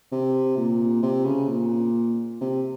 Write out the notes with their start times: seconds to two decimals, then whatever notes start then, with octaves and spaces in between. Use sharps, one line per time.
0.12 C3
0.58 A#2
1.03 C3
1.25 C#3
1.48 A#2
2.41 C3